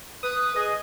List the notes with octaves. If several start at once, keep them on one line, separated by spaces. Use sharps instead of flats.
B4 D#6
G#4 D#5